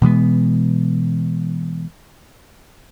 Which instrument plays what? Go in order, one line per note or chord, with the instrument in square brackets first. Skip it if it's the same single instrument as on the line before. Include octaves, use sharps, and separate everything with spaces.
[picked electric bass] B2 E3 G#3 B3